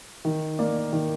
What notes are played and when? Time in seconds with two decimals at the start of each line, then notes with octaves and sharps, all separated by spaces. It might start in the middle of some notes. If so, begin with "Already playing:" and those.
0.25 D#3
0.59 A#3 D5
0.93 D#3